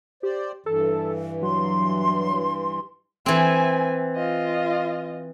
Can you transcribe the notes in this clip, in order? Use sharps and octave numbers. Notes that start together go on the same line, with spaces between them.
G4 C5 D5
G2 E3 A4
F#3 C6
E3 C4 E5 G#5
F4 D#5